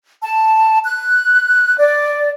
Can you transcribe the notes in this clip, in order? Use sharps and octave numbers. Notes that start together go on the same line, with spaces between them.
A5
F#6
D5